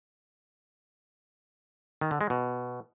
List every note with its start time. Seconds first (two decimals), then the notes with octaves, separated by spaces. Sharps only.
2.01 D#3
2.11 D3
2.21 G#3
2.30 B2